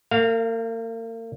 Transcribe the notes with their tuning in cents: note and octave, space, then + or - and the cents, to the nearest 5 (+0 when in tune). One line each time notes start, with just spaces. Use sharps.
A#3 -40 F5 +0